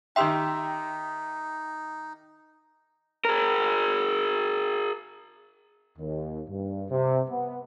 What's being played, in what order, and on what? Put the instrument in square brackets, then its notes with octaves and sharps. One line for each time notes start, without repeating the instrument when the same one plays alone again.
[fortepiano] D#3 G4 E5 [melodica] D#4 [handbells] G5 C6 E6
[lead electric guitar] G#4 A#4
[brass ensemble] D#2
G2
C3
B3